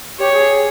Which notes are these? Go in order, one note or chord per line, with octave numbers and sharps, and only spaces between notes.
G4 C#5
G#4